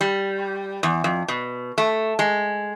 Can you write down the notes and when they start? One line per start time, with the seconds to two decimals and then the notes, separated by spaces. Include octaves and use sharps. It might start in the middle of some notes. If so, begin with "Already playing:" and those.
0.01 G3
0.83 E2
1.04 F2
1.28 B2
1.78 A3
2.19 G#3